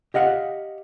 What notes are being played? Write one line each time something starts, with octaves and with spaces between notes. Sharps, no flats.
G4 D#5 F5 F#5